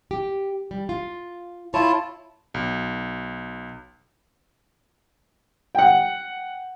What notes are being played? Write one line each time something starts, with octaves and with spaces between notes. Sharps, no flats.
G4
G3
F4
E4 F4 C#5 A5
B1
F#5 G5